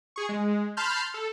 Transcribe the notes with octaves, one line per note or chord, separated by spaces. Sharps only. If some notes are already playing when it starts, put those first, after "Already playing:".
G#4 C#6
G#3
A5 B5 C6 F6 G6
A4